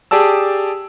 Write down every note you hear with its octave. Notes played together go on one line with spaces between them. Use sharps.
G4 G#4 D5 A5 E6